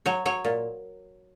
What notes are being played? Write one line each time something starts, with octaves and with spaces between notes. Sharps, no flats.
F#3 C#5
F#3 C#5
A#2